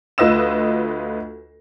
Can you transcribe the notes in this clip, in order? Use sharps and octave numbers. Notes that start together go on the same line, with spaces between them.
D2 F4 B4 D#5 E6 E7